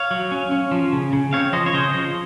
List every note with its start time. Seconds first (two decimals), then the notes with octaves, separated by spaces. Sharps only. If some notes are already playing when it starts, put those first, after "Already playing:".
Already playing: C#5 F5
0.11 F#3
0.32 C#4
0.51 C#4
0.71 F3
0.92 C#3
1.13 C#3
1.33 C4 C#5 F5
1.53 F3 C5 D#5
1.66 C#5
1.74 C#3 C5 D#5
1.94 F3